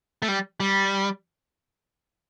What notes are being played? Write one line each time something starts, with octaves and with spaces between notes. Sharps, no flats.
A3
G3
G3